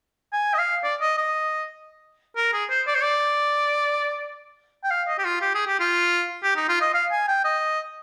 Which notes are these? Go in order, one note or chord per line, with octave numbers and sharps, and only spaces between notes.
G#5
D#5
F5
D5
D#5
D#5
A#4
G#4
C5
D5
C5
D5
G5
F5
D#5
G4
F4
G4
G#4
G4
F4
G4
D#4
F4
D#5
F5
G#5
G5
D#5